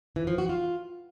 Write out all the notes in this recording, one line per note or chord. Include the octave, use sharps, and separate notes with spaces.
E3
F3
F#4
F4